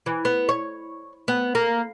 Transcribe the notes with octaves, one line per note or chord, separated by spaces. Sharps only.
E3
B3
C#5
B3
A#3